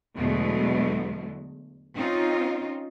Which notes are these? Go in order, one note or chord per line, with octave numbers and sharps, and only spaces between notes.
E2 B2 D3 F#3 G#3 A3
C4 C#4 D#4 F4